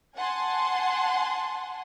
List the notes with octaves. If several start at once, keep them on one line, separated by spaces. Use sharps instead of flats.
F#5 G#5 A5 C6